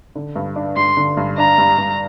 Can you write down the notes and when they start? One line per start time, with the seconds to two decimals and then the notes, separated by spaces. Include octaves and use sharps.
0.15 D3
0.36 G2
0.56 D4
0.76 G2 C6
0.97 D3
1.17 G2
1.38 D4 A#5
1.58 G2
1.78 G2